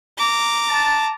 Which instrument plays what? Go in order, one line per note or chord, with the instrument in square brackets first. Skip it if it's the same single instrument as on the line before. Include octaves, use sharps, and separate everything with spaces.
[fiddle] A#5 D6
[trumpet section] A5